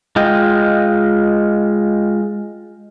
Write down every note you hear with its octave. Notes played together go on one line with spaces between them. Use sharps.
G#3 F4 D#5 G5